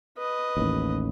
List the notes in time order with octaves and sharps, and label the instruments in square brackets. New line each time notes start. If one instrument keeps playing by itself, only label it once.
[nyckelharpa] B4 D#5
[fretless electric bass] A1 D#2